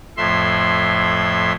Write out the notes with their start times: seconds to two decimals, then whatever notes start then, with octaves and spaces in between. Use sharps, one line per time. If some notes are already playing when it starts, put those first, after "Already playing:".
0.17 F2 A2 E5 C6